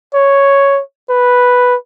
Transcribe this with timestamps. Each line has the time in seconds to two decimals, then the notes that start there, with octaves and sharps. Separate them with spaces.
0.14 C#5
1.09 B4